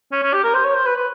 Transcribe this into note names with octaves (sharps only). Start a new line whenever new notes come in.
C#4
C#4
G4
A#4
C5
C#5
C5
B4
B4